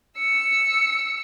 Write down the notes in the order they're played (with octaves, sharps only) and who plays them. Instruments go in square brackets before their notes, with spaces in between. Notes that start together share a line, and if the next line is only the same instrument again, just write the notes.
[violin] E6 C#7